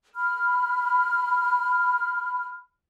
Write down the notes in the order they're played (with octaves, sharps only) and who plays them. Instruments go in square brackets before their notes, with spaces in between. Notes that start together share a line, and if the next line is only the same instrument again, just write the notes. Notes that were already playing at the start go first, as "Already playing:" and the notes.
[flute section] B5 F6